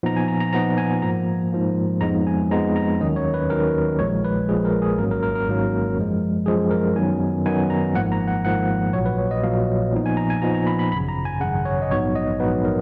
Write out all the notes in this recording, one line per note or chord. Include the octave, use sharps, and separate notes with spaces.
A#2 F3 B3 D#4 A#5
G#5
A#5
A#5
A#2 F3 B3 D#4 A#5
G#5
G#2 F3 A#3 A#5
G#2 F3 A#3
F2 F3 G#3 B3 D#4 A#5
G#5
F2 F3 G#3 B3 D#4 A#5
A#5
D#2 D#3 F#3 C#4 D#5
C#5
B4
D#2 D#3 F#3 C#4 A#4
A#1 A#2 F3 G#3 C#5
B4
A#1 A#2 F3 G#3 G#4
A#4
G#4
G#1 G#2 F#3 A#3 C#4 A#4
A#4
A#4
A#4
G#1 G#2 F#3 A#3 C#4
F#2 F3 G#3
F#2 F3 G#3 G#4
A#4
F#2 D#3 F#3 B3 D#4 G#5
F#2 D#3 F#3 B3 D#4 G#5
A#5
G#1 G#2 F3 A#3 F#5
A#5
F#5
G#1 G#2 F3 A#3 F#5
A#1 A#2 F#3 C#5
B4
C#5
D#5
A#1 A#2 F#3 F5
A#2 F3 B3 D#4
G#5
A#5
G#5
A#2 F3 B3 D#4 A#5
A#5
B5
B5
G#1 F#2 C#3 B5
A#5
G#5
G#1 F#2 C#3 F#5
C#5
D#5
A#1 G#2 F#3 B3 D#4 C#5
D#5
A#1 G#2 F#3 B3 D#4 B4
A#4